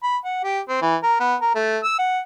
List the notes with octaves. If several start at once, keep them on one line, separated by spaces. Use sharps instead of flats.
B5
F#5
G4
C4
E3
A#4
B3
A#4
A3
E6
F#5